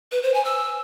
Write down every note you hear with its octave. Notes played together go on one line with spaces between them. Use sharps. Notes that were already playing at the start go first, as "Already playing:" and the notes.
B4
C5
G#5
E6